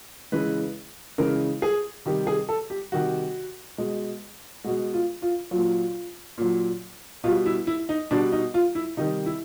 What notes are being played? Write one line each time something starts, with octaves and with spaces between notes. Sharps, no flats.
C#3 E3 G#3 B4
C#3 E3 G#3 A#4
G#4
C3 D#3 G3
G#4
A4
G4
C3 D#3 G3 F#4
B2 G#3
B2 G#3 F#4
F4
F4
A#2 F#3 F4
A#2 F#3
B2 G3 F4
E4
E4
D#4
B2 G3 D4
D#4
F4
E4
C3 D#3 G3 D#4
E4